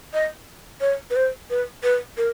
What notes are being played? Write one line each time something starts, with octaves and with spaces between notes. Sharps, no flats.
D#5
C#5
B4
C5
B4
B4
A#4